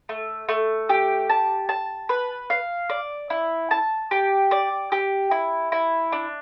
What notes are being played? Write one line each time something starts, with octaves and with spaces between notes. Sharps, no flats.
A3
A3
G4
A5
A5
B4
F5
D5
E4
A5
G4
D5
G4
E4
E4
D4